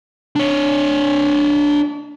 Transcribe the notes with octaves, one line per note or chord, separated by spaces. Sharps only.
D4 C#5